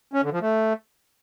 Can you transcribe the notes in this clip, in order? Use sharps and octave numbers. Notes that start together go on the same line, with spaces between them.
C#4
D3
F3
A3